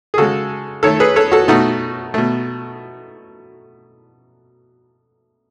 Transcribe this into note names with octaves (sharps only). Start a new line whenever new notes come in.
G#4
C#3 G#3 F#4 A4
D#3 A3 A4 C#5
G#4 B4
A4 C#5
F#4 A4
B2 A3 D#4 F#4
B2 A3